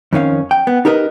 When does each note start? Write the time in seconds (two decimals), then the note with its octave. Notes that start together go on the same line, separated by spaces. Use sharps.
0.13 F2 D#3 C#4 F5
0.51 G5
0.67 B3
0.85 D#4 G4 A#4 B4 D#5